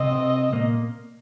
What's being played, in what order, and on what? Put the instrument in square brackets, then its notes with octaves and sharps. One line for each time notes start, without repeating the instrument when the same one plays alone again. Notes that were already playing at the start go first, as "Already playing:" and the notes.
Already playing: [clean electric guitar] C3 C4 [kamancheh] D#5
[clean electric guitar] A#2 A#3